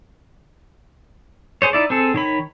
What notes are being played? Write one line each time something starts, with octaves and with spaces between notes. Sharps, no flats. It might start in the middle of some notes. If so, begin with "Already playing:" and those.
G#4 C5 C#5
D#4 E4 D5
C4 G#4 A4
D#3 C#5 B5